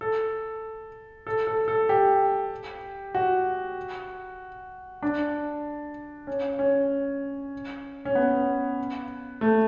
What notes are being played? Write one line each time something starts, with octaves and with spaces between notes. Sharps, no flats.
A4
A4
A4
A4
G4
F#4
D4
C#4
C#4
C#4
B3
A3